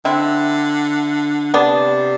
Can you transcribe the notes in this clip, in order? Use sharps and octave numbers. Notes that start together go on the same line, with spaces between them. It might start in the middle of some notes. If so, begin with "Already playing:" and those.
D3 C4 E4
C3 B3 D4